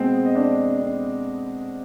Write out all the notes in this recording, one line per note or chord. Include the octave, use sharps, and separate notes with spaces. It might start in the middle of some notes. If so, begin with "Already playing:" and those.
Already playing: B2 G#3 C4
D#5
D4 D5
D5
C4 C5